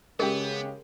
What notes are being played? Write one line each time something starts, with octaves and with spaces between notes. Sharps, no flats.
C#3 G#3 B3 G4 G#4 A#4